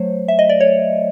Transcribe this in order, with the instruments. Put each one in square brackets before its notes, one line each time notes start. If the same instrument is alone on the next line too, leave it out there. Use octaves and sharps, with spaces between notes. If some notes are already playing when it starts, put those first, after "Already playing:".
Already playing: [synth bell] F#3 A3 C5 C#5
E5
D#5
D5
C#5